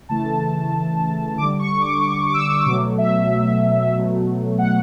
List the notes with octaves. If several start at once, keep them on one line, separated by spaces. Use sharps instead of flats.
C#3 E3 A3 A5
D3 G3 D6
C#6
D6
D6
E6
B2 F#3 A3 D6
E5
B2 F#3 A3
F#5